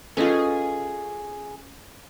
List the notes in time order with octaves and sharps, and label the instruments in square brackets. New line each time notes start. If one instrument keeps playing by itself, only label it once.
[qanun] C#4 F4 [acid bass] G#4 [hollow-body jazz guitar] A4 B4 D#5